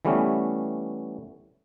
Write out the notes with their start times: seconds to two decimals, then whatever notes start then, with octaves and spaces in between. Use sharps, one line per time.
0.05 E3 G3 A3 B3 C#4